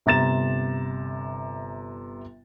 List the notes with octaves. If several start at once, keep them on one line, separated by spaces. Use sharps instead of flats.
G1 C3 A#5 A6 E7